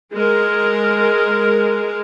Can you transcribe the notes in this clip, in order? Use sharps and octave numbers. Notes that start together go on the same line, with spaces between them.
G#3 G#4 A#4